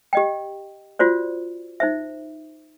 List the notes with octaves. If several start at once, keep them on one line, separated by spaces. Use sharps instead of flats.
G4 D#5 G5
F4 F#4 C5 D5
D#4 C5 E5